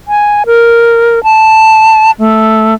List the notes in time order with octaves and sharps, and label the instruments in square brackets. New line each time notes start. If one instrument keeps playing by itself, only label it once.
[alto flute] G#5
A#4
A5
A3